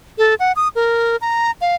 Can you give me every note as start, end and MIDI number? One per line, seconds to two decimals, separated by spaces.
0.18 0.35 69
0.40 0.52 78
0.56 0.68 87
0.75 1.16 70
1.21 1.51 82
1.61 1.75 77